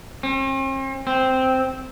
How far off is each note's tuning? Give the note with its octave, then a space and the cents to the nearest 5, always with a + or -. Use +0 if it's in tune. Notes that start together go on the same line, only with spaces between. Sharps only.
C4 +45
C4 -5